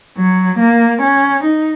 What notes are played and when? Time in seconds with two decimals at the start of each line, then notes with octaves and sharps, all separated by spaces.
0.18 F#3
0.60 A#3
1.02 C#4
1.45 D#4